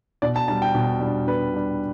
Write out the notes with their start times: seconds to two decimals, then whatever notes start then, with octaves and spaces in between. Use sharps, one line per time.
0.22 B2 D5
0.36 A5
0.48 G3 D4 A5
0.62 G5
0.75 B2
1.00 G3
1.06 D4
1.27 B2 B4
1.54 G3 D4